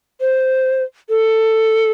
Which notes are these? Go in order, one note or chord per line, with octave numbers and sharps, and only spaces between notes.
C5
A4